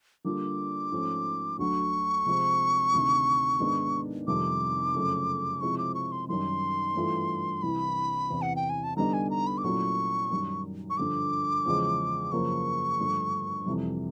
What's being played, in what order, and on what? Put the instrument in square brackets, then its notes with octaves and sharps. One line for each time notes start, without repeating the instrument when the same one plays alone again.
[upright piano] D3 G3 A#3 D4 F4 [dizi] D6
[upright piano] G#2 F3 A3 C#4
[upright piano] D2 D3 F#3 [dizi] C#6
[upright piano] C3 F3 G#3 C4
D2 C3 D#3
G#2 D#3 G#3 B3 D4
[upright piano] F2 C3 D#3 G3 [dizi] D6
[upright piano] F#2 C#3 F3 A3 C#4
[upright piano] C3 F3 G#3 C4 E4 [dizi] C#6
[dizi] D6
C#6
C6
[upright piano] F#2 D#3 G3 [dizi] C6
[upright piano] G2 E3 A3 D4 F4
[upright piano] C2 C3 E3 [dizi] B5
[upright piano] E2 C3 E3
[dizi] F#5
G5
G#5
A5
[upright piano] D3 G3 B3 D#4 [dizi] A#5
[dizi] G#5
A#5
B5
D6
[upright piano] A#2 F#3 A3 C#4 E4 [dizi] C#6
[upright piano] F#2 D#3 G3
[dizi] C#6
[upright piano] G2 D3 F3 [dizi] D6
[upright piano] E2 C#3 F3 G#3
[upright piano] F#2 C#3 F3 A#3 [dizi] C#6
[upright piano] G2 D3 F3 A3
F2 C3 E3 G3